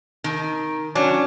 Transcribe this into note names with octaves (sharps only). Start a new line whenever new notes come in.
D#3
F#3 C#4 D4